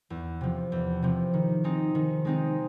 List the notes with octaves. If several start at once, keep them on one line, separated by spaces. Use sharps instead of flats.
E2
C3 F3
E2
C3 F3
D#3
G#3 C4 D#4
D#3
G#3 C4 D#4